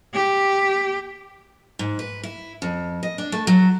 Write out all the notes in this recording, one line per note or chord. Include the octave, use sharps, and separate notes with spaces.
G4
G#2
B4
E4
F2
D#5
D4
A3
F#3